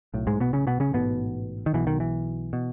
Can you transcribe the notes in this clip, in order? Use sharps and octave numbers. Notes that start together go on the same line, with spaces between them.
B1 A2
G#2 G#3
B2 B3
C#3 C#4
B2 B3
C#3 C#4
A1 G#2 B2 B3
D#3
B1 B2 E3
D#3
E3
B2